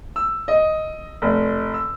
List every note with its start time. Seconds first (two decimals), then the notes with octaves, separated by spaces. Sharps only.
0.16 E6
0.48 D#5
1.22 F1
1.74 E6